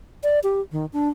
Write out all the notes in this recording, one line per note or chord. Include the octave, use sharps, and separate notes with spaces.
D5
G4
D#3
D4